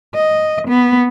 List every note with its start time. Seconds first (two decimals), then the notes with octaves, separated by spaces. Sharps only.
0.15 D#5
0.68 B3